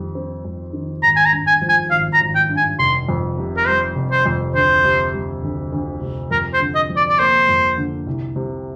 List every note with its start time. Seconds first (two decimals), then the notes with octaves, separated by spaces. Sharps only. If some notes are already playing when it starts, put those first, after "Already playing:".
Already playing: F2 D#3 G3
0.15 C4
0.45 F2
0.73 D#3
1.03 G#1 A#5
1.16 G#5
1.25 A#5
1.32 G2
1.47 G#5
1.62 F3
1.69 G#5
1.90 G#1 F5
2.13 A#5
2.21 G#1
2.35 G5
2.49 G2
2.57 G#5
2.79 F1 C6
3.09 F2
3.38 C3
3.57 A#4
3.66 G3 C5
3.96 F1
4.11 C5
4.26 F2
4.54 D2 C5
4.84 C3
5.13 G3
5.43 D2
5.73 D2
6.01 C3
6.31 F2 A#4
6.53 C5
6.60 D3
6.75 D#5
6.90 F3
6.96 D5
7.09 D5
7.19 A#3 C5
7.49 F2
7.77 D3
8.07 C2
8.36 C3